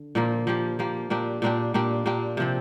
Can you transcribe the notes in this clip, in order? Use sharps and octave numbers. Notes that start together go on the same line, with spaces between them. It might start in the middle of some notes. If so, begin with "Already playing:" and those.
Already playing: D3
A#2 F3 A#3
F3 A#3 G4
F3 A#3 G4
A#2 A#3 D4 G4
A#2 A#3 D4 G4
A#2 A#3 D4 G4
A#2 A#3 D4 G4
C3 F3 C4